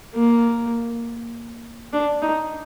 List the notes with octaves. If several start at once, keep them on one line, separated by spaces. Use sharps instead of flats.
A#3
D4
D#4